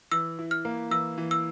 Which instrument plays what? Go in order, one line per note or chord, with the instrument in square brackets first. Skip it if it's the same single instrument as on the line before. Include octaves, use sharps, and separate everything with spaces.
[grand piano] E3 [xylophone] E6
[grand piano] E4
[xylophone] F6
[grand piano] A#3
[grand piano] E3 [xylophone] E6
[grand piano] E3
[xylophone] E6